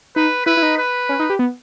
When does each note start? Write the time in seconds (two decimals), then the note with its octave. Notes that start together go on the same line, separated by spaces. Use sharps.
0.16 D#4 B4
0.46 E4 B4
0.57 E4
0.62 D#4
0.78 B4
1.09 C#4
1.19 D#4
1.30 G4
1.39 B3